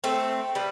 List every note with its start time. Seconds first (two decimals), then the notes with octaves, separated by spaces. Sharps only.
0.04 A3 C4
0.55 G3 B3